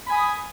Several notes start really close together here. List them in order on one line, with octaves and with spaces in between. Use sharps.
B5 G#5 D#6